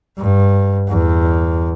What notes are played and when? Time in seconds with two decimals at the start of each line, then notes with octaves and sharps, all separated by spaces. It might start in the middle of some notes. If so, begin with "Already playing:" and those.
0.18 G2
0.89 E2